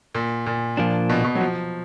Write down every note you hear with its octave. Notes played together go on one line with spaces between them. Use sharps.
A#2
A#2
A#2 F3 A#3 D4
B2
B2
F#3
F3